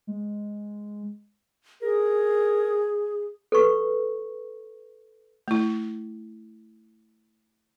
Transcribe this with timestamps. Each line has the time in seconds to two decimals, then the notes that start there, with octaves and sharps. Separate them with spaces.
0.07 G#3
1.82 G#4 A#4
3.52 A4 B4 C#6
5.48 A3 E4